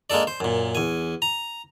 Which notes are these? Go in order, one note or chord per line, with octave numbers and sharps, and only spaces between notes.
G#3 A#3 D4 A4 D5
C5
F#2 A#2
E2 G#5
A#5